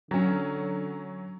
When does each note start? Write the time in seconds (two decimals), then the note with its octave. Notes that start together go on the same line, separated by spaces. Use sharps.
0.11 D3 F#3 C#4